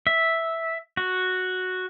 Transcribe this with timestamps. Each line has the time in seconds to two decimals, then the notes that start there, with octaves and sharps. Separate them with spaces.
0.07 E5
0.97 F#4